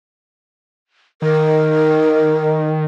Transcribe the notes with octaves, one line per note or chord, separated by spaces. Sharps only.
D#3 A#4